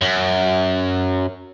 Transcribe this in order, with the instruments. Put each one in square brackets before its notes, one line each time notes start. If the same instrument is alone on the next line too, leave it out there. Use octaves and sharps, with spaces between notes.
[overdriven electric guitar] F#2